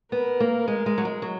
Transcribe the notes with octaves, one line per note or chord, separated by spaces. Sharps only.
B3 A#4
A#3
G#3
G#3
F#3
G#3
F#3